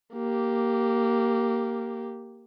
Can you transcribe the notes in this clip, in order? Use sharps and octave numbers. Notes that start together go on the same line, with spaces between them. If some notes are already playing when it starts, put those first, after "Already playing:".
A#3 G4